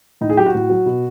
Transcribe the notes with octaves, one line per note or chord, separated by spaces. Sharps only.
A2 D#4
G#4
F#3 G4
F#4
A2
F#3
B2